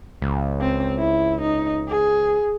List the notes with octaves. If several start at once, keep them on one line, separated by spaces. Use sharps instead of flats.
C#2
C4
E4
D#4
G#4